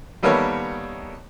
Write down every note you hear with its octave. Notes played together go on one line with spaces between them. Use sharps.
D#3 G3 A#3 B3 A4 C#5